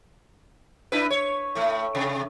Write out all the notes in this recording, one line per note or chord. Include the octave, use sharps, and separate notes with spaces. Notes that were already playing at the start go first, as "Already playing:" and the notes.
D4 E4 B4
C#5
A2 A3
C3